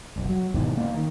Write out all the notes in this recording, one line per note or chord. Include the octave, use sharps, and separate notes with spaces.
F#1 B1
F#3
G#2 B2 D#3 E3
C#3 A#3
D#3